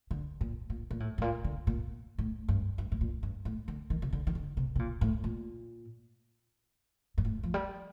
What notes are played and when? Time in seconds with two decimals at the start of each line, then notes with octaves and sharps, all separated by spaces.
0.11 D3
0.41 A#2
0.70 A#2
0.91 A#2
1.00 A2
1.18 A2
1.22 A#2
1.44 D3
1.67 A#2
2.18 A2
2.48 G2
2.78 G2
2.92 A2
3.01 A#2
3.23 G2
3.45 A2
3.68 D3
3.90 D#3
4.02 C3
4.13 D3
4.27 D#3
4.35 D3
4.57 C3
4.75 C3
4.79 A#2
5.01 A2
5.24 A#2
7.18 G2
7.25 A2
7.43 F3
7.54 G3